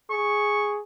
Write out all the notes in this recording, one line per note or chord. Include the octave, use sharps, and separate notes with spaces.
G#4 C#6